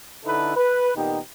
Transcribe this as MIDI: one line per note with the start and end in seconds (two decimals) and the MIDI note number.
0.25 0.53 50
0.25 0.53 63
0.25 0.53 64
0.25 0.53 69
0.25 0.53 71
0.56 0.90 71
0.96 1.20 46
0.96 1.20 51
0.96 1.20 59
0.96 1.20 63
0.96 1.20 67